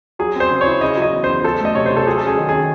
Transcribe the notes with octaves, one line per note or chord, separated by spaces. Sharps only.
F#3 G#4
C4 C5
C#3
C#5
E4
C#3 D#5
F#3 D#5
E2
C5
E2
F#3 A4
A3 D#5
C3 C#5
C3 C5
A4
F#3 G#4
C#4 A4
G#4
D#3
G#4
D#3